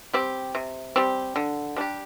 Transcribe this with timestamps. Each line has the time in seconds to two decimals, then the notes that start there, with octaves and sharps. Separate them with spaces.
0.13 G3 C4 G4
0.55 C3
0.96 G3 C4 G4
1.36 D3
1.76 G3 D4 G4